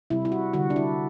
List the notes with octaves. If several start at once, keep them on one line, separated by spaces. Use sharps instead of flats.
C3 G3 E4
E4
F#4
D3 G3 F#4
D4
E4